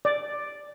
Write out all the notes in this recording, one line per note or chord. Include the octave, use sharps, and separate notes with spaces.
D5